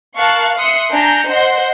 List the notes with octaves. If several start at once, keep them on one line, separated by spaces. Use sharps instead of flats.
A#4 F5 A5 C#6 F#6
E5 C6 D#6 F#6 C#7
D4 G#5 A#5 G6 C#7
C5 D#5 F#5 C6